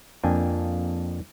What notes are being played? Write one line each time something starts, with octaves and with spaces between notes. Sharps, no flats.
F2 A#3 D4 G5 G#5